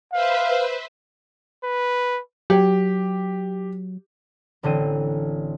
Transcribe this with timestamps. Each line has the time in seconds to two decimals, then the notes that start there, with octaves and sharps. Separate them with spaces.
0.13 B4 C5 E5 F5
1.64 B4
2.50 F#3 G4
4.63 A1 D3 C4 D#7